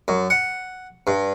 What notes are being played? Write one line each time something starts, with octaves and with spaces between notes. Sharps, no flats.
F#2
F#5
G2